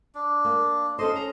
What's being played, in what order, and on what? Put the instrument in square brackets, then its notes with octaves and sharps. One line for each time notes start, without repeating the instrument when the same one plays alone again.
[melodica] D4
[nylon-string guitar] A#3
[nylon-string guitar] C#4 A4 C5 [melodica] D#5 C6
[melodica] A#5